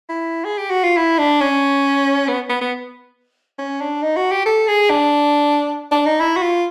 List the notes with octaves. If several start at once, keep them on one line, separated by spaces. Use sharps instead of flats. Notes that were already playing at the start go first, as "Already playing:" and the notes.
E4
G#4
G4
F#4
F4
E4
D4
C#4
B3
B3
B3
C#4
D4
D#4
F#4
G4
A4
G#4
D4
D4
D#4
E4
F#4
F4